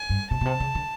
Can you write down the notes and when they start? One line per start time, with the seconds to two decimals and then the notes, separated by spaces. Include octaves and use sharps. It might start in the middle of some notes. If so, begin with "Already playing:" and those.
Already playing: G#5
0.10 G2
0.31 C3 A5
0.41 B2
0.45 C3
0.60 C#3
0.75 D3